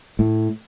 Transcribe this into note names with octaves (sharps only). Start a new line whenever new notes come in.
A2